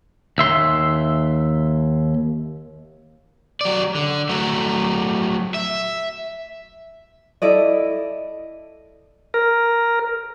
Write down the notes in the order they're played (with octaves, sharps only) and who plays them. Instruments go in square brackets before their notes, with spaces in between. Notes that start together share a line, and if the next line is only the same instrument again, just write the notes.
[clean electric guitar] D#2 E5 C6
[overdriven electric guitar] F#3 D5
D3
F#3 A3
E5
[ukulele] E4 A4 D5 D#5
[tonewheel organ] A#4